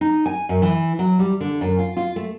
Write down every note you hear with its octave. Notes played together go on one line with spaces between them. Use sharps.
D#4
G#5
F#2
E3
F#3
G3
D3
F#2
F4
F4
A3